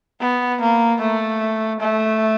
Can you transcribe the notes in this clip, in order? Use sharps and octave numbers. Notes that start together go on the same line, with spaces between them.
B3
A#3
A3
A3